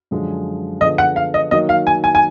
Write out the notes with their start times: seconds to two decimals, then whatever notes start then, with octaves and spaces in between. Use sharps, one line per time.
0.11 F#2 D3 F3 G#3
0.81 D3 F3 B3 F4 G#4 D#5
0.98 F#5
1.16 F5
1.34 D#5
1.51 D#3 F#3 A#3 D#4 D#5
1.69 F5
1.87 G#5
2.04 G#5
2.15 G#5